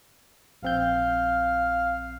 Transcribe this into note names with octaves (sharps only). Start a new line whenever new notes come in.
A#1 C4 F5 G6